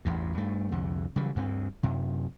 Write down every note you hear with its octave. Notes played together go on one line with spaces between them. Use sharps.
A1 E2 G2
G2 A3
C2 F2 D3
C#3 E3 F#3 G3
D2 G2 A3 C4
F#2 C3